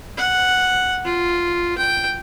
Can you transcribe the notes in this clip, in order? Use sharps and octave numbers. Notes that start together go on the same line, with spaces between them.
F#5
F4
G5